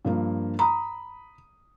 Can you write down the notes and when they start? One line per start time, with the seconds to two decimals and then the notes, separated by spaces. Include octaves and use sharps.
0.05 G2 F3 A#3
0.59 A#5 B5 D#6